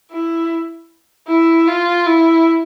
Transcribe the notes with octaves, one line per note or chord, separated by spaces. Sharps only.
E4
E4
F4
E4